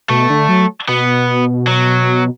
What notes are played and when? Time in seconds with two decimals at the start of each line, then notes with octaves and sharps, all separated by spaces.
0.10 B2 A3
0.30 D3
0.49 F#3
0.88 B2 B3
1.67 F#3